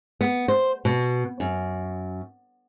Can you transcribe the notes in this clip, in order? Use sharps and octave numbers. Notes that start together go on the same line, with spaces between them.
B3
C5
B2
F#2